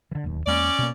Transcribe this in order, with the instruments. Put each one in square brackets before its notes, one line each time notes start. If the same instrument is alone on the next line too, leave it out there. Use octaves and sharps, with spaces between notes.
[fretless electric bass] D3 E3
D1 D#2
[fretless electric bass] E2 G#3 A#3 [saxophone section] C#4 D5
[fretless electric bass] B2 A#3